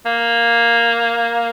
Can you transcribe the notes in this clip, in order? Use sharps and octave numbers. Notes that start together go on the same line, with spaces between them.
A#3